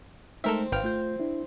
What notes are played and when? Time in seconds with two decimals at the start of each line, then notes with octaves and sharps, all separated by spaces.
0.44 G#3 A3 C4 D#4 A4 A#4 E5
0.72 G#1 B4 F5 G5 F6
0.84 A3 F4 G6
1.20 D4 E4